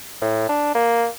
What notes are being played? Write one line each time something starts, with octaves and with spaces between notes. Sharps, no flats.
A2
D4
A#3